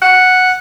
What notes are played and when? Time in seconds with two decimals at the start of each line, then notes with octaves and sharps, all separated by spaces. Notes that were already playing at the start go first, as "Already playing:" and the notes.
0.02 F#5